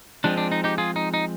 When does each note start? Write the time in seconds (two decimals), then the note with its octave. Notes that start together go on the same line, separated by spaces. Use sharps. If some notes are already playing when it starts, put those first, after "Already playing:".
0.24 F3 G#3 C4 D4
0.37 D4
0.52 D#4
0.64 D#4 G4
0.78 F4 G#4
0.96 D#4
1.14 D#4